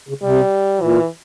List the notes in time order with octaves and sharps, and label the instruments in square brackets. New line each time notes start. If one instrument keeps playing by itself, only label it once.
[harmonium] C#3
[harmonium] C3 [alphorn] G3
[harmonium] A#2 [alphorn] E3